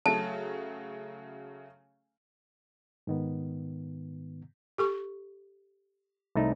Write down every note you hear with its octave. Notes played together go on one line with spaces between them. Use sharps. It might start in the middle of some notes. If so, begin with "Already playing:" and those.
C#3 F#3 A3 A5
G#2 D#3 B3
G4 A4 C#6
C2 A3 D#4